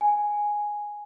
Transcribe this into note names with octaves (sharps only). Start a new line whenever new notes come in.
G#5